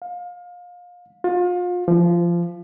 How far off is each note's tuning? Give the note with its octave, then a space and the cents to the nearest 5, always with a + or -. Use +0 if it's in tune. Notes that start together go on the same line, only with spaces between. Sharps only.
F5 +25
F4 +35
F3 -20